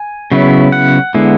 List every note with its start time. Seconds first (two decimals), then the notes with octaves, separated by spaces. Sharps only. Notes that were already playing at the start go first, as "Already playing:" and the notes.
Already playing: G#5
0.32 C#3 F#3 B3 E4
0.72 F#5
1.14 D3 G#3 B3 E4